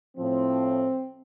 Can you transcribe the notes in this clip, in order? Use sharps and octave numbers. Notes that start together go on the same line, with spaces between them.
A2 F3 C4